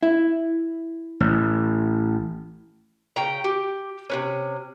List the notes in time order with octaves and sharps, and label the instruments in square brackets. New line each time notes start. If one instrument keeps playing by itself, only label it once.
[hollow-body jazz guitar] E4
[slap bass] A1
[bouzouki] C#3 G5 A#5
G4
C3 B3 C#4